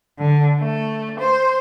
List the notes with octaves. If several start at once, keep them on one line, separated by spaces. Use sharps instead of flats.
D3
A3
C5